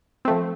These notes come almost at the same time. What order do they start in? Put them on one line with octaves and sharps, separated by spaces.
C4 A3 F3